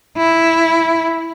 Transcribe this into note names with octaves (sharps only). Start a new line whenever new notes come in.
E4